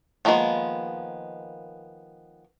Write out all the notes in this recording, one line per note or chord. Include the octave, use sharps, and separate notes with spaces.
D#3 F3 G#3 A#3 B3